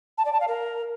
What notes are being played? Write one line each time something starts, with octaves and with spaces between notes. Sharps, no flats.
A5
D5
A5
F5
A#4